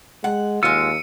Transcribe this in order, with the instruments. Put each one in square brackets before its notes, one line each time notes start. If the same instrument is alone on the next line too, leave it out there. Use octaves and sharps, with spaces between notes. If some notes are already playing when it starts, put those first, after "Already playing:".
[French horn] G#3 [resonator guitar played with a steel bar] F#5
[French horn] D#2 [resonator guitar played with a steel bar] G#3 F4 [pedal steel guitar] E6 [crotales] C#7 D#7